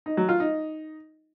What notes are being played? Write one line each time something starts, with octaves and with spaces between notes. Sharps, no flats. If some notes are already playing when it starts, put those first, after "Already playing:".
D#4
F#3
F4
D#4